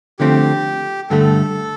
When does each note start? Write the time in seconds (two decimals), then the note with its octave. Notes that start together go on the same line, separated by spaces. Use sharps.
0.19 D3 F3 A3 C4 G4
1.10 G2 D3 A3 A4